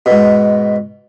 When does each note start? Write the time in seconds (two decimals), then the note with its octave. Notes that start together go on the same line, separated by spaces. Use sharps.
0.06 G#2 B2